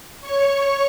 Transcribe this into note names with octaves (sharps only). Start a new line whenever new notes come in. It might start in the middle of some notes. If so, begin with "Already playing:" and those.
C#5 C#6